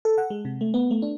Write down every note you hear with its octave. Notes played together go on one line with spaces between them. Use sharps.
A4
F#5
G#3
C3
A3
B3
A3
D4